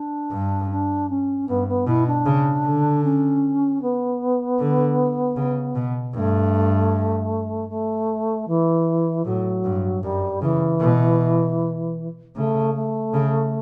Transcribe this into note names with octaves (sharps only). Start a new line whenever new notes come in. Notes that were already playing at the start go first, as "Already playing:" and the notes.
Already playing: D4
G2
D4
C#4
G2 B3
B3
B2 E4
D4
C#3
D3
C#4
B3
D3
C#3
B2
G2 A3
A3
E3
A2 F#3
G2
F#2 G3
C#3 E3
B2
C#3 A3
A3
C#3